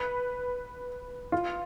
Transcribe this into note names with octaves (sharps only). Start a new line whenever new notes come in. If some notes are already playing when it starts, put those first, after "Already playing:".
Already playing: B4
F4